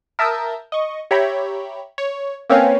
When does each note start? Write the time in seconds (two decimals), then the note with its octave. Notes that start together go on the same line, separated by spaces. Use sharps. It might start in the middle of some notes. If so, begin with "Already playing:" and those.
0.19 A#4 E5 A5 D#6 E6 G6
0.72 D#5 C#6
1.11 G4 C#5 E5 G5 A#5 B5
1.98 C#5
2.50 A#3 C4 C#4 B4 C#5 F5